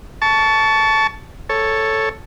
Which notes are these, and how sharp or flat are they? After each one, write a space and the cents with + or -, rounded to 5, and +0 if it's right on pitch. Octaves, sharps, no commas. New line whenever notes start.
A5 -10 C#6 +25
A4 +0 C#5 +0